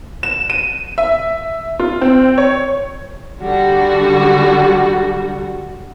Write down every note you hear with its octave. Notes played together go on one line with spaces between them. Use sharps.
E7
D#7
E5
F4
C4
C#5
D3 G3 F#4